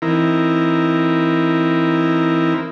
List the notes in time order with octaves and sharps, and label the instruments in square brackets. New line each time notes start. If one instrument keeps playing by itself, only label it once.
[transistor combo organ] E3 C4 D#4 E4 A#4